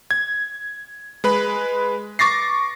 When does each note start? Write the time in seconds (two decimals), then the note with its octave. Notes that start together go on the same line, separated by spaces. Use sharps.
0.11 G#6
1.24 G#3 B4 B5
2.19 C#6 D6 A6 A#6 C7